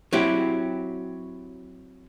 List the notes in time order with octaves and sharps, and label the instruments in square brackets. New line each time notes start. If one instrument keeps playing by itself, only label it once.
[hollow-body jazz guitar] F#3 C4 E4 G4